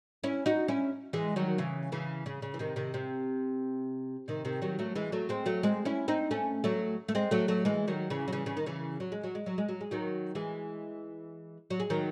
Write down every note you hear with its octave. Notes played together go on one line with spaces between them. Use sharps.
C#4 E4
D#4 F#4
C#4 E4
E3 G#3
D#3 F#3
C#3 E3
C#3 E3
C#3
C#3
E3
C3 D#3
C3 D#3
C3
C3 D#3
C3 D#3
D#3 F#3
F#3 A3
E3 G#3
F#3 A3
G#3 C4
F#3 A3
G#3 C4
C#4 E4
C4 D#4
A3 C#4
F#3 A3
A3
G#3 C4
F#3 A3
F#3 A3
E3 G#3
D#3 F#3
C#3 E3
F#3
C#3 E3
C#3
D#3
C#3 E3
F#3
G#3
F#3
G#3
F#3
G#3
F#3
G#3
D#3 F#3
E3 G#3
F#3
G#3
D#3 F#3